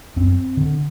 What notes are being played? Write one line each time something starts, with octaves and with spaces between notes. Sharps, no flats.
F#2 C4
D3